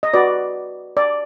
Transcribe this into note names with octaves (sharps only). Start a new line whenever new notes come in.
D#5
F#4 B4 D5
D5